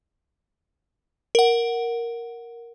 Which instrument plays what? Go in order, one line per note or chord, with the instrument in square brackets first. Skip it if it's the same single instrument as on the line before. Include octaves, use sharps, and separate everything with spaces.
[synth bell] A#4 F#5